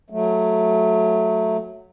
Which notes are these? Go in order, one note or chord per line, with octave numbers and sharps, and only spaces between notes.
F#3 A3